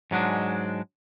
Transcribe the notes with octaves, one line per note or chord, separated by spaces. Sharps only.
G#2 F#3 G#3 D4